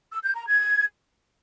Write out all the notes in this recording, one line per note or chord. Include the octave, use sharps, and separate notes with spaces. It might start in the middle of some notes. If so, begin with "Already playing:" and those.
E6
G6
A#5
G#6